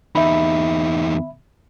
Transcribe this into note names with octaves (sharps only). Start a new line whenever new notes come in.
E2 D#4 E5 B5